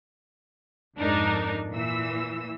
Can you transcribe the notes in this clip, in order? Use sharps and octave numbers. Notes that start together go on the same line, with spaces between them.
F2 G#2 D4 D#4 A#4
A#2 E3 E6